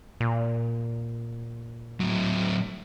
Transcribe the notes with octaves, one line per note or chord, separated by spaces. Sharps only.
A#2
A2 F#3